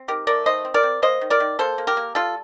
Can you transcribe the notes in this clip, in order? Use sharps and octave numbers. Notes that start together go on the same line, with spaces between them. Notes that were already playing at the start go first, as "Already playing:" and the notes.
Already playing: C4
D#3 G4 A#4
A3 A#4 D5
D#3 C5 D#5
C4
A#4 D5
C4
A#3 C5 D#5
D#3
A#4 D5
D#3
A#3 A4 C5
A#3
G4 A#4
A#3
G3 F4 A4